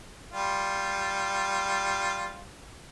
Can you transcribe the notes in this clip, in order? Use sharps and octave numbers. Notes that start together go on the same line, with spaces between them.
G3 F4